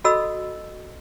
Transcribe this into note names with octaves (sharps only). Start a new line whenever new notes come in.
F#4 A4 D#5 B5 E6